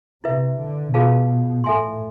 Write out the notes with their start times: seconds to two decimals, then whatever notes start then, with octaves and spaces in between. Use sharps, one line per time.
0.24 C3 E4 B4 E5
0.59 D3
0.94 B2 F4 G#4 B4 F5 A5
1.64 A2 A4 E5 G#5 C6